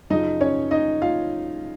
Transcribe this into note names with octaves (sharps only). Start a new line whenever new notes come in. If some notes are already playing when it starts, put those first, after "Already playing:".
F#2 C#3 F3 D#4 D#5
C#4 C#5
D#4 D#5
F4 F5